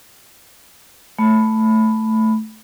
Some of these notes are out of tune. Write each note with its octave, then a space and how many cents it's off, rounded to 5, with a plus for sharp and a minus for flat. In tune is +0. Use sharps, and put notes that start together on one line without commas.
A3 +0 B5 +5